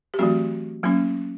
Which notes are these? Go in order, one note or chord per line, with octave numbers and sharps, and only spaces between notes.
G4
E3 F#3 A3 C4 F#4
F#3 A#3 C#4